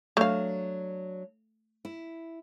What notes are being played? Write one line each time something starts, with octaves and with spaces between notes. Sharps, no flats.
F#3 A3 D4 F5
E4